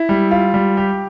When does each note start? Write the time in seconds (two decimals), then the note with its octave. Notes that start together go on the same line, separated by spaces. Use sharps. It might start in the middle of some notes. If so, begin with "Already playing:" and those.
Already playing: E4
0.09 G3
0.31 F4
0.54 G3
0.77 G4